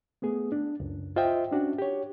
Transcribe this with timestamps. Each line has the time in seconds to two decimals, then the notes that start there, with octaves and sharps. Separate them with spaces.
0.22 A3 B3 G#4
0.52 D4
0.80 C#2 F#2
1.16 F4 C5 D#5 E5 G5
1.51 C#4 D4 F#4
1.78 G4 C#5